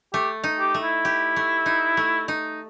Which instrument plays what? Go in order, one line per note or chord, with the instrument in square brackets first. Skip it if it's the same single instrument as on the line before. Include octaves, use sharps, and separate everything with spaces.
[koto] A3 [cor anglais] G4
[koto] D#4
[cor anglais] G4
[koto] A3
[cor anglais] E4
[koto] G4
A3
D#4
A3
D#4